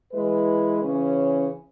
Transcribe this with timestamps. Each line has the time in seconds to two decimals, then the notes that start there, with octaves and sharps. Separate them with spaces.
0.13 E3 G#3 E4 B4
0.80 C#3 E3 C#4